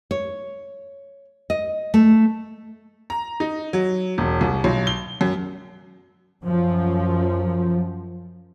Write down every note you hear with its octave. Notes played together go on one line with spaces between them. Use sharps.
C#5
D#5
A3
A#5
D#4
F#3
E1
C2
B1
G7
F#2
F#2 F3